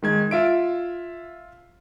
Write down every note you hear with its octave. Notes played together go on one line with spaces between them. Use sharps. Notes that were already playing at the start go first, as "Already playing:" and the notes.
D#3 G#3 G#6
F4 E5 D7